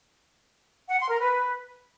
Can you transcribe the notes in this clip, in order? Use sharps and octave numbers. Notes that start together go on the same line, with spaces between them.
F#5
C6
A#4
B4